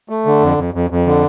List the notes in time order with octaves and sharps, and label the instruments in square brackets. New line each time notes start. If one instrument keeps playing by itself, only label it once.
[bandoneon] A3
D3
F2
F2
F2
F2
D3